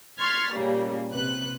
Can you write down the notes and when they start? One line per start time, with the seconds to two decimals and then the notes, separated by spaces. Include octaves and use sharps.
0.19 C6 C#6 F6 G#6 A6 B6
0.52 A#2 C#3 G3 A#3
1.11 A#1 C3 B4 F#6